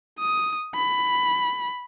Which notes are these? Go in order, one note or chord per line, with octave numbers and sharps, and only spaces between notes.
D#6
B5